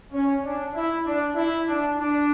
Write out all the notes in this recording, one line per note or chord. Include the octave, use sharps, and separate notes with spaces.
C#4
D4
E4
D4
E4
D4
D4